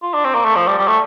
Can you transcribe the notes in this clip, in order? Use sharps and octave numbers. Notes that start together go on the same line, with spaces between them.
F4
D4
C4
A#3
A3
F3
G3
G3
A3